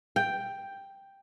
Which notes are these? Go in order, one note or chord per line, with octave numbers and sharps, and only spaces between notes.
G5